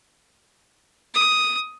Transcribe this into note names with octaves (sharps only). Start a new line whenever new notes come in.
D#6